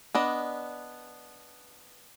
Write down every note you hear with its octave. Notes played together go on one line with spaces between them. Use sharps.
B3 D4 D#5